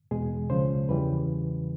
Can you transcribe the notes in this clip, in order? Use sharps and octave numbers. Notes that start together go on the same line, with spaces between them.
E2 B2 G#3 G#4
C#2 C#3 F3 G#3 C5
E2 C#3 E3 G3 B4